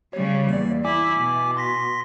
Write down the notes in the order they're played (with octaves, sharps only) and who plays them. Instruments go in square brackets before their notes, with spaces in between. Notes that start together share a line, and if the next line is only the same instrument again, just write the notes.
[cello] C#3 G3 [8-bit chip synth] C#5
[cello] E2 [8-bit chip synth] A#3 D5
[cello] E4 [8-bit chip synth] G#5 D6
[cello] B2
[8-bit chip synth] C6 A#6 B6